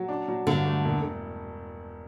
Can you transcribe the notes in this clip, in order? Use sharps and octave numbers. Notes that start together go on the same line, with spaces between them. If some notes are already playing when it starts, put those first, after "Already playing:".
Already playing: F#3
D4
F#3
G2 D3
A3
E1